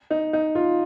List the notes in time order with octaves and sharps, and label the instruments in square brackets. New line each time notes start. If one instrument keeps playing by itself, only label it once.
[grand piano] D#4
D#4
F4